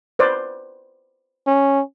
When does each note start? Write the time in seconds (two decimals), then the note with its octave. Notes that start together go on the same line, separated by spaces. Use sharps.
0.19 B4 C5 D5
1.47 C#4